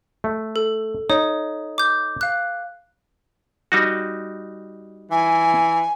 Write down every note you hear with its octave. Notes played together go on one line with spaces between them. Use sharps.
A3
A4
D#4 C#5
D6 G6
F5 F#6
G3 D#4 F#4
E3 G#5